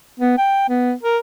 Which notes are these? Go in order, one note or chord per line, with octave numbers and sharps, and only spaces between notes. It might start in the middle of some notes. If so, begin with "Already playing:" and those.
B3
G5
B3
A#4